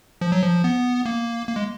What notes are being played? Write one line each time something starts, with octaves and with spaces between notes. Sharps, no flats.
F3
F#3
F3
B3
A#3
A#3
G#3